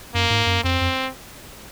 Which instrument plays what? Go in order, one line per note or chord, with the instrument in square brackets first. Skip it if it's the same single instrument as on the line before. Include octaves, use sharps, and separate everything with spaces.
[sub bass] F#2 [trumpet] A#3
[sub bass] G#2
F#2
[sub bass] F2 [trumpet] C4
[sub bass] F2